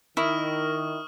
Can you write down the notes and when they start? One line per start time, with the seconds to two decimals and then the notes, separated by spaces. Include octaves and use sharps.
0.17 D#3 E4 A#4 C#6 D#6 F6